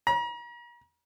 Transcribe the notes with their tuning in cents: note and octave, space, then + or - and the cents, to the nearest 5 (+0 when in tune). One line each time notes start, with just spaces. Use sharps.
A#5 +40